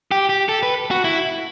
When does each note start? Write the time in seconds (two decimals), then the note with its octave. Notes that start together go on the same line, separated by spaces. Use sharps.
0.11 G4
0.29 G4
0.49 A4
0.63 B4
0.91 F#4
1.04 E4